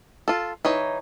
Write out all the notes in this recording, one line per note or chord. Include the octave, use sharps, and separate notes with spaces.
F4 A4
E3 D#4 C#5